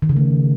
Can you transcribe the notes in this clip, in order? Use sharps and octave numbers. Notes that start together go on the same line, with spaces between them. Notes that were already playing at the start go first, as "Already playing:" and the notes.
D#3
C#3
A3